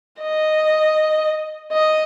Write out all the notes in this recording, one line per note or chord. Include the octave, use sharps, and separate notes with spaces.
D#5
D#5